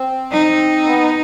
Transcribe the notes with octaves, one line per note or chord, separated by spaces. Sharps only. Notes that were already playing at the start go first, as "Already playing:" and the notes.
Already playing: C4
D#4
B3